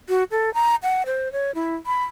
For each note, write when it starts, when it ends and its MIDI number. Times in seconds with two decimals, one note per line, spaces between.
0.09 0.24 66
0.31 0.52 69
0.54 0.76 82
0.83 1.03 78
1.06 1.31 72
1.32 1.54 73
1.55 1.75 64
1.86 2.04 83